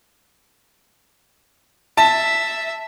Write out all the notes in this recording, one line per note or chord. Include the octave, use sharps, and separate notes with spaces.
E5 A5